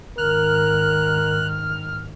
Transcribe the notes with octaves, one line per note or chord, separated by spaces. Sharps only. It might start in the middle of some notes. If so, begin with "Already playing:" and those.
G#2 D#3 A#4 F6 F#6